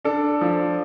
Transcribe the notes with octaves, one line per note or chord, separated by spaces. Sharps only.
D4 A4
F3